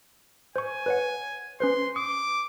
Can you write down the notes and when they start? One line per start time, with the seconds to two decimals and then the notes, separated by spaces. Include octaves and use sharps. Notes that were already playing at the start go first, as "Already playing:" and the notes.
0.56 C5 G#5 C#6
0.86 B4 C#5 F#5
1.60 C#4 B4 C5 C6
1.96 D6 D#6